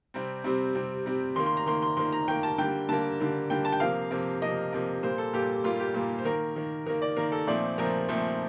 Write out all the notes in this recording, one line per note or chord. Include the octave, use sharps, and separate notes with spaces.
C3 G3 C4
C3 G3 C4
C3 G3 C4
C3 G3 C4
D#3 A#3 C6
C6
A#5
D#3 A#3 C6
C6
D#3 A#3 C6
A#5
D#3 A#3 G5
A5
D3 G3 A#3 G5
D3 G3 A#3 A5
D3 G3 A#3
D3 G3 A#3 G5
A5
G5
C3 F3 A#3 F5
C3 F3 A#3
C3 F3 A#3 D#5
C3 F3 A#3
A#2 G3 A#3 C5
A4
A#2 G3 A#3 G4
A#2 G3 A#3 F4
G4
A#2 G3 A#3
C5
D#3 A#3 A#4
D#3 A#3
D#3 A#3 A#4
D5
D#3 A#3 A#4
A4
A#2 F3 A3 C4 D5
A#2 F3 A3 C4 A#4
A#2 F3 A3 C4